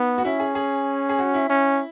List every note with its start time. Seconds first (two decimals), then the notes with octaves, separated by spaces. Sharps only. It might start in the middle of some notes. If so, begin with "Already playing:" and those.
Already playing: B3 D#4
0.18 F#4
0.25 C#4 E4
0.40 G#4
0.55 G#4
1.09 G#4
1.19 F#4
1.34 E4
1.50 C#4